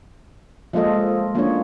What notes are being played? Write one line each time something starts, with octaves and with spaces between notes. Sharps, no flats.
F3 G#3 A#3 F4 A4 D#5
F3 A#3 C#4 D4 E4 C#5